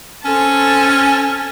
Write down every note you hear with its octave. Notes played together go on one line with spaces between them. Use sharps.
C4 C#4 A4 A5